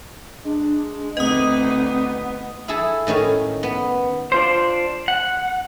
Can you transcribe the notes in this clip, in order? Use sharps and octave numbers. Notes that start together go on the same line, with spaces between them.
G#3 D4
D2 B3 C4 D#4 D#5 D#6
E4 G#4 A4
A2 D#3 C#4 G#4
B3
D4 F4 C5
F#5